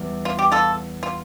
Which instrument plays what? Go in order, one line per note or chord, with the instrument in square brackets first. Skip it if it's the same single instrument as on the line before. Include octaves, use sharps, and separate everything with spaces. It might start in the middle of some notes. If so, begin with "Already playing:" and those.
Already playing: [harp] E2 E3 G3
[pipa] F4
G4
F4 A4
F4